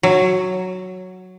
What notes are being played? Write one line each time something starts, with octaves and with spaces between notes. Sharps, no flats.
F#3